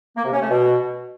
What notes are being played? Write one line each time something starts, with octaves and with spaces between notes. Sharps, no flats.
A#3
C3
C#4
A3
B2